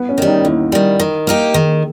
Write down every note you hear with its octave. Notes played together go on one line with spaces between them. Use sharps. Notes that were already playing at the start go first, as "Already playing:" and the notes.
Already playing: B3
C#4
D#3 G3
D#4
D#2 E4
D#3 G3
D#3
A#3 D#4 G4
D#3 G#4